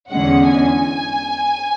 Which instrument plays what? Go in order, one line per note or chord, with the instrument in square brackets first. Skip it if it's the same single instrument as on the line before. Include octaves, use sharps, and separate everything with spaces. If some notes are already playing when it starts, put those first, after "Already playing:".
[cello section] E2 D3 G#3 C#4 [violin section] F#5
[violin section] G#5